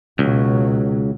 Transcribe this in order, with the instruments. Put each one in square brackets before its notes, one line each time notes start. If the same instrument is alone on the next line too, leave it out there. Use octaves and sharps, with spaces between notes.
[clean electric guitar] C#2 [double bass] B2 F#3